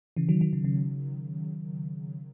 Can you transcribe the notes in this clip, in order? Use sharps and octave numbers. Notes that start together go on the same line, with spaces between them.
C#3 E3
D#3 F#3
D#3 F#3
C#3
C#3